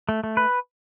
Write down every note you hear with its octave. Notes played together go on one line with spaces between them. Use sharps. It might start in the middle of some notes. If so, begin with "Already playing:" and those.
A3
A3
B4